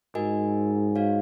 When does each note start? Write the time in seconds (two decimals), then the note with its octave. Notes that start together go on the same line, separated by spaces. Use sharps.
0.15 G#2 F#4 A#4 D#5 G#5
0.96 F#4 C#5 F5